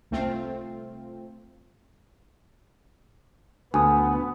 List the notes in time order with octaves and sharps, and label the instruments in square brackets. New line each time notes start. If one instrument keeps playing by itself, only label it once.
[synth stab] C2 A3 C4 F4
[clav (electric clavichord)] D2 [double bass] B3 [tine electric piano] G#5 D#6